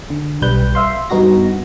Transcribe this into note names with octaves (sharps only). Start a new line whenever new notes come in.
D3
B1 G3 B4 G6
E5 F5 C6
G2 B3 D#4 F#4 A#6